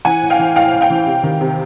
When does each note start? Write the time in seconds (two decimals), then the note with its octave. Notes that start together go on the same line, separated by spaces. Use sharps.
0.05 E3 F#5 G#5
0.22 A2
0.30 F5 G5
0.39 E3
0.56 A2 F5 G5
0.73 A2
0.81 F5 G5
0.90 E3
1.07 C3
1.23 D#3
1.41 C3